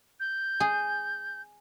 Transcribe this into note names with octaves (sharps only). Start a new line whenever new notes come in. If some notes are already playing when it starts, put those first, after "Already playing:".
G6
G#4